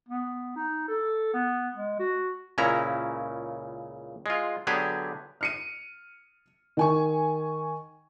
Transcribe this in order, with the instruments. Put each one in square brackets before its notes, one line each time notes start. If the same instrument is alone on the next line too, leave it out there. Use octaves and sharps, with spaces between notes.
[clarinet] B3
D#4
A4
B3
G#3
F#4
[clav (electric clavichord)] C#2 A#2 C#3 C#4 E4 A#5
G#3 F4
D3 F#3 B3 G4 G#4 G#5
[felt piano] F6 C#7 D#7
D#3 G#5 C#6